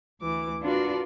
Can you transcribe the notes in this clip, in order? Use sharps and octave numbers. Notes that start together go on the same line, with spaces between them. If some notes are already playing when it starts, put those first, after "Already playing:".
D2 E3 D6
D4 F4 F#4 A#4 B4 D5